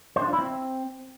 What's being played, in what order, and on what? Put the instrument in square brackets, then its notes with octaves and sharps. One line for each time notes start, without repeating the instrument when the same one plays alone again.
[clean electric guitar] C5
D4
F4
E4
C4